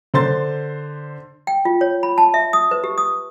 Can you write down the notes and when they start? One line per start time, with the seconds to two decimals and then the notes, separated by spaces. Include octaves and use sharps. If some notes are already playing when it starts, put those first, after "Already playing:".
0.14 D3 C5 C6 A6
1.47 G5
1.65 F4
1.81 C#5
2.03 B5
2.18 A5
2.34 E5
2.53 D#6
2.71 B4
2.84 G4
2.98 D#6